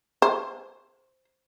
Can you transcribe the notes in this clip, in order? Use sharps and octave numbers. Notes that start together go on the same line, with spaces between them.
C5